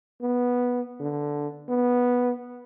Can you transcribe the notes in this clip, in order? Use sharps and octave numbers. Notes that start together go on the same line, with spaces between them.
B3
D3
B3